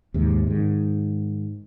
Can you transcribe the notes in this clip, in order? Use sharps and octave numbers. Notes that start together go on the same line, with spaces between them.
D#2 G#2 C3
G#2 D#3